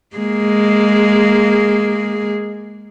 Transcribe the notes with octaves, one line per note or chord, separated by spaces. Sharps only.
G#3 A#3 G#4